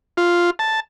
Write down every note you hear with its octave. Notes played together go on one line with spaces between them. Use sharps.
F4
A5